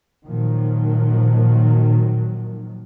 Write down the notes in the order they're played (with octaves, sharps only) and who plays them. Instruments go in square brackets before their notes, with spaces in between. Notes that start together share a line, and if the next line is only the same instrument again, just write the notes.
[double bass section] A#2 D#3 F3 F#3